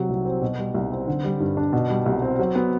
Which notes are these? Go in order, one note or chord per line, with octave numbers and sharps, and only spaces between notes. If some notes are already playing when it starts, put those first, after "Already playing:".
Already playing: C3 F#3
C2
C4
B2
G3
C2
C4
D3
G3
G2
D4
B2
G3
C2
C4
F#3
B3